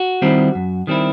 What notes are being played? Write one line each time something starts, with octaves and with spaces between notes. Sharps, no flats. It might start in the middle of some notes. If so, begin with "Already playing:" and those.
Already playing: F#4
D#3 G3 C4 E4
F#2
D#3 G3 C4 E4